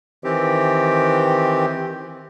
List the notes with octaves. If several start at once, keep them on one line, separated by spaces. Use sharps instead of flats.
D#3 E3 C4 G4